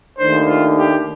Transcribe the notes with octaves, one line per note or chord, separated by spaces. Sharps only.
D#2 D#3 A3 D4 C5
F4
G4